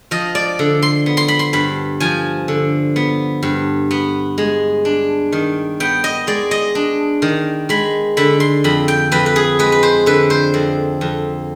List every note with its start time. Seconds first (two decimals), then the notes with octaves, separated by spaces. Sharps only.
0.11 F3 D#5
0.35 D5
0.59 D3
0.82 C6
1.06 B3
1.17 C6
1.28 B5
1.39 C6
1.53 G2 B5
2.00 F3 G#5
2.48 D3
2.96 B3
3.43 G2
3.91 B3
4.38 G#3
4.85 D4
5.32 D#3
5.80 B3 G5
6.04 D#5
6.27 G#3 D5
6.51 D#5
6.75 D4
7.22 D#3
7.69 G#3 B5
8.17 D3 B5
8.40 C6
8.64 F2 B5
8.88 G5
9.12 F2 B4
9.26 B4
9.36 G#4
9.59 G#3 B4
9.72 B4
9.83 C5
10.06 D3 B4
10.30 C5
10.54 F2
11.01 F2